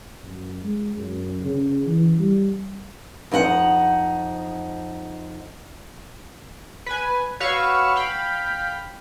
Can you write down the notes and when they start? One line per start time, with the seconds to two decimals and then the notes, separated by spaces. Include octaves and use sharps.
0.25 F#2
0.64 G#3
0.98 F#2
1.42 C#3
1.86 E3
2.19 G3
3.31 F2 D#4 F#4 F#5
6.86 B4 G#5
7.40 F#4 B4 C#5 F5 C#6 E6
7.96 F5 G5 B5